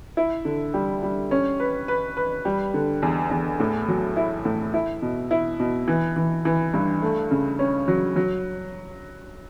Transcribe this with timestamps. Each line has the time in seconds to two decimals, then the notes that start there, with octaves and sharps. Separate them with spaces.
0.17 E4
0.45 D3
0.74 G3
1.03 G3
1.31 C#4
1.60 B4
1.88 B4
2.17 B4
2.45 G3
2.74 D3
3.02 E2
3.31 E2
3.60 A2
3.88 F#3
4.16 E4
4.45 A2
4.74 E4
5.02 B2
5.31 E4
5.59 B2
5.88 E3
6.16 E3
6.45 E3
6.74 G2
7.02 A3
7.31 C#3
7.59 C#4
7.88 F#3
8.16 F#3